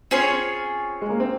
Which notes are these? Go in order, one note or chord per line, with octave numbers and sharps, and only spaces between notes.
C4 C#4 F4 G#4 C#5
G#3
A#3
C4